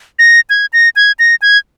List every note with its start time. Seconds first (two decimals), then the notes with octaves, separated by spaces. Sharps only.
0.19 A#6
0.50 G#6
0.73 A#6
0.96 G#6
1.19 A#6
1.42 G#6